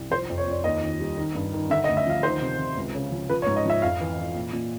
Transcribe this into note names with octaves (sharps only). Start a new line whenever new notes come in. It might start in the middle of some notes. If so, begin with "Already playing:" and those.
Already playing: C2
F3 C5
F2
C#5
F2 D5
D#2 D#5
D#3
G3
D#3
G2
D#3
D3 E5
D#5
D2
E5
F3 F5
D#3 C5
C3
C3
C#2
C#3
F3
F3 B4
C#5
G#2
D#5
F3 E5
F2 F5
E3
E3
A#2
A#2